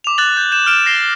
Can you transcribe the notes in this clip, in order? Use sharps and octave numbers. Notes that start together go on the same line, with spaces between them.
D6 F7
D6 F#6 A6 F#7
G6
G6 E7
F6 D7 E7
A#6 C7 G7